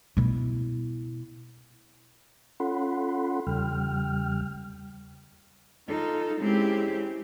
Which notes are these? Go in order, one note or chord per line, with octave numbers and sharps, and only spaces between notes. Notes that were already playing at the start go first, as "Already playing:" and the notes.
B2 E4
C#4 F4 A4 F#5 B5 C6
E2 C#3 G3 G5 F6
D#4 F4 A4
G#3 C4 C#4 E4 G4 G#4